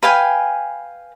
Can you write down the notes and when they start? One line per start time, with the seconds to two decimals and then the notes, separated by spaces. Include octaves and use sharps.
0.03 B4 F5 G5 G#5